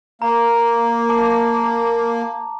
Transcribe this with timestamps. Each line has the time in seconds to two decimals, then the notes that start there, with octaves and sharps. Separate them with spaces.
0.22 A#3 A#5
1.09 A5 D6